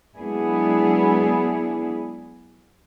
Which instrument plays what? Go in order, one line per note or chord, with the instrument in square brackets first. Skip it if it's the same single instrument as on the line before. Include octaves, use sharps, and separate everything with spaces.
[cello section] F#3 G#3 B3 D4 E4 G#4